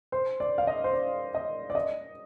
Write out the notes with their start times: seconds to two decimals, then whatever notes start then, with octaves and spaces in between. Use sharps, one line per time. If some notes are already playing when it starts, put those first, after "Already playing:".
0.12 C5
0.40 D5
0.58 F5
0.67 D#5
0.84 C5
0.93 D5
1.35 D#5
1.70 D5
1.75 D#5